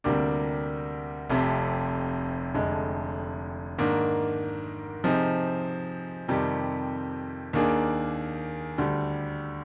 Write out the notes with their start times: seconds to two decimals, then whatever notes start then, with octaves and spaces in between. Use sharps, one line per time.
0.04 D2 C3 G3 A#3 D4
1.30 F1 F2 C3
2.54 F1 F2 D3 G#3
3.78 G#2 D#3 A#3 D4
5.04 C3 F3 C4 D#4 G#4
6.29 F2 C3 D#3 G3
7.53 D#2 D#3 A#3 D4 G#4
8.78 D2 D3 G3